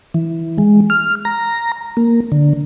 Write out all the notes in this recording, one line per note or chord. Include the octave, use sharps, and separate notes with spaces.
E3
G#3
F6
A#5
A#3
D3